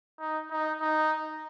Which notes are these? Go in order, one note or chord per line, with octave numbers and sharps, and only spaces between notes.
D#4
D#4
D#4